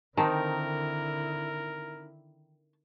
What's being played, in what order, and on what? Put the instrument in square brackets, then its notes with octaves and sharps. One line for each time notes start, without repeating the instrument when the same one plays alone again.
[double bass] D3 E4 [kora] D#3 C4 D#4 [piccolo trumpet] A#4 [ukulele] A5